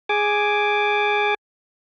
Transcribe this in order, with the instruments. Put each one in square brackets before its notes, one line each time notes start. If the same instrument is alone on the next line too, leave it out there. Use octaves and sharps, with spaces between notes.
[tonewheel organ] G#4 G#5 D6